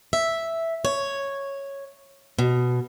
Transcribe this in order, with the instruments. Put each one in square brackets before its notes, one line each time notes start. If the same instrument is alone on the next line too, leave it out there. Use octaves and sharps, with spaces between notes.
[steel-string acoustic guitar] E5
C#5
B2